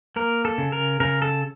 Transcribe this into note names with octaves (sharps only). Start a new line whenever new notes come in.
A#3 A#4
A4
C#3
A#4
C#3 A#4
A4